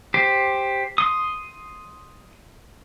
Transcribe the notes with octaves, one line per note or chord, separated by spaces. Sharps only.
G4 C5
C6 D#6